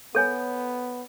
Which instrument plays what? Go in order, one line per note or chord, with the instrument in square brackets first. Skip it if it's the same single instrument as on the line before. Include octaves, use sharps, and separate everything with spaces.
[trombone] B3 [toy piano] A4 C#5 G#5